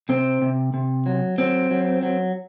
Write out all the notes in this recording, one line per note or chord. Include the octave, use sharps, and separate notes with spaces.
C3 C4
C3
C3
F#3
F#3 C4
F#3
F#3